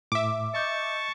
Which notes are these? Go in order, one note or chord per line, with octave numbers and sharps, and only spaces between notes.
A2 E5 D6
D#5 A5 C#6 G6